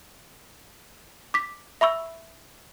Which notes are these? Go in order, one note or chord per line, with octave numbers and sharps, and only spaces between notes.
D6 B6
E5 B5 C#6 E6